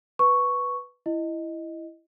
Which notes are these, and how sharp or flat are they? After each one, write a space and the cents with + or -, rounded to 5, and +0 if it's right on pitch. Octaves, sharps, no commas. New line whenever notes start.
B4 +0 C#6 +0
E4 +10 D#5 +0